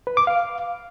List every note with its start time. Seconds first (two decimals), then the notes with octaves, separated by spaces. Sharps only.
0.07 B4
0.17 D6
0.27 F5